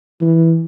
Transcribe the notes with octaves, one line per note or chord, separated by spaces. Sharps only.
E3